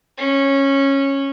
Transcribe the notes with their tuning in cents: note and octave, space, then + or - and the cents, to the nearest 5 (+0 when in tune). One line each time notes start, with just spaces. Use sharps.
C#4 -15